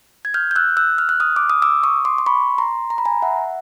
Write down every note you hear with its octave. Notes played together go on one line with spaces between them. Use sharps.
G#6
F6 G6
G6
E6 F#6
E6 F#6
F6
F#6
D#6 F6
D6
D#6
D6 E6
C#6 D#6
C6 D6
C6
B5 C#6
A#5 C6
A#5
B5
G#5 A#5
E5 F#5